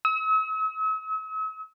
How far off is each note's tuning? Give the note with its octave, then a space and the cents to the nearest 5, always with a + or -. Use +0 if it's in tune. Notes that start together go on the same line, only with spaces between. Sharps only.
E6 -45